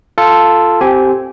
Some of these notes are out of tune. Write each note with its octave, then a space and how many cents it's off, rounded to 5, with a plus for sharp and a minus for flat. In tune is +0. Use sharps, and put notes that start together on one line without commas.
F4 -5 A4 +0
C4 +0 G4 -15 G#5 +0